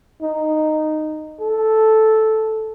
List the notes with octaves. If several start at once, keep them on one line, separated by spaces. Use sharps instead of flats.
D#4
A4